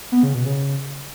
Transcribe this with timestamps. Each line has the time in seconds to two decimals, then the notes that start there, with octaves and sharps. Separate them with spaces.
0.12 B3
0.23 C#3
0.34 B2
0.46 C#3